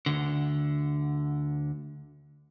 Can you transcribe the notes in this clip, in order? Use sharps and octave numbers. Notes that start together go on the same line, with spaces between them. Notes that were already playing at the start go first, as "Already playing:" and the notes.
D2 D3